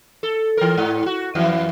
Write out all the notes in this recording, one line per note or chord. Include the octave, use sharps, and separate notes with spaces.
A4
E3 A#4
G#2
F#4
F2 E3